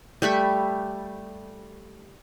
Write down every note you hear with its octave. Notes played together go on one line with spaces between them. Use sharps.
G3 A3 B5 C#6